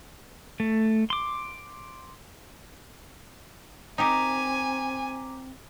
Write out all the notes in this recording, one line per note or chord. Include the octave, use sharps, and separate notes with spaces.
A3
C6 D6
C4 D#4 G4 A#4 G#5 A#5 D6 B6